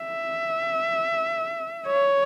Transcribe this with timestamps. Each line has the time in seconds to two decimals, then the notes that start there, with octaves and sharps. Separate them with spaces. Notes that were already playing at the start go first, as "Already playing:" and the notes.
Already playing: E5
1.87 C#5